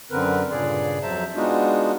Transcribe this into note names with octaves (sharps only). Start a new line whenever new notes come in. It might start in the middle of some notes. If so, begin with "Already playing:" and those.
F#2 D3 C4 A#4 B4
G2 A#2 C#3 G#4 D5
F2 F#3 C5 E5 A5 A#5
G#3 B3 D4 D#4 F4 F#4